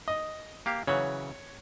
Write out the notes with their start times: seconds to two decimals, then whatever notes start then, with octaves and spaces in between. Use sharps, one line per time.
0.08 D#5
0.66 A#3 G4 F5
0.87 C#3 E3 F#3 C#5